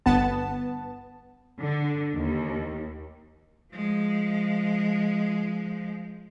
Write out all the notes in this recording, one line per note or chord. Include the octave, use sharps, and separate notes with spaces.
G1 B3 A5
D3
D#2
F3 G#3